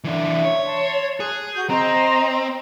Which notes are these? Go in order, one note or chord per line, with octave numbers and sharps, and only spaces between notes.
E3 D4 E5
C#5
A5 C6
G#4 F#6
F#4 G6
C4 C5 D#5 A#5